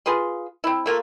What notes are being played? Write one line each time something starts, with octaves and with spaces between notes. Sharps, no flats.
F4 G#4 B4 C6
C4 E4
A3 A#3 F4